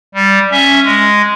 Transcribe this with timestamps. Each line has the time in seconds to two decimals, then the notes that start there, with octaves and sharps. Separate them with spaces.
0.14 G3
0.52 C#4 E5
0.85 G#3